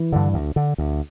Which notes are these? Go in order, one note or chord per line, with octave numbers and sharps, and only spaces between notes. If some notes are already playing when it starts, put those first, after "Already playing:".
Already playing: E3
G2 D3
D2
D3
D2